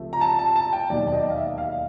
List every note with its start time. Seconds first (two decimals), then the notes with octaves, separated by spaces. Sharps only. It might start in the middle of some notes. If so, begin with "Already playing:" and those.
Already playing: C#2 C3 F3 A3
0.13 A#5
0.21 A5
0.39 A5
0.56 A5
0.73 G5
0.90 E1 D#2 D#3 F#3 D5
1.07 D5
1.13 D#5
1.31 F5
1.36 E5
1.58 F5